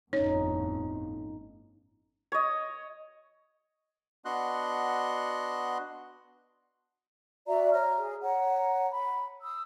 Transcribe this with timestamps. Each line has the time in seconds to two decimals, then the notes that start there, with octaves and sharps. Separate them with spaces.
0.13 G1 F2 A2 C#4 D#4 C#5
2.32 C#5 D#5
4.25 B3 D4 F#4 D#5 C6 F#6
7.47 F#4 D5 E5 A#5
7.73 C#5 A#5 F6
8.00 G#4
8.22 C#5 F#5 A#5
8.89 B5
9.41 D#6 E6